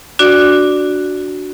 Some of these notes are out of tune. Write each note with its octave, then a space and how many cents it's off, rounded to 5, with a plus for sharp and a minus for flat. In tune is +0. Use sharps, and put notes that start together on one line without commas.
D4 +0 F#4 +0 D5 +0